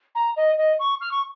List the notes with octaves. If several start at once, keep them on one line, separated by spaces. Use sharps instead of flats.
A#5
D#5
D#5
C#6
F6
C#6